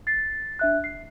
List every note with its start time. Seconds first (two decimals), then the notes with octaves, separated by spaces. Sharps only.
0.07 A6 C7
0.59 D4 E5 F#6
0.84 C7